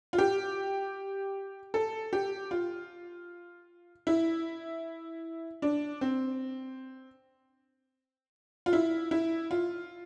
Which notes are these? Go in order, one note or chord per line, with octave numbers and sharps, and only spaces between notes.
F4
G4
A4
G4
F4
E4
D4
C4
F4
E4
E4
F4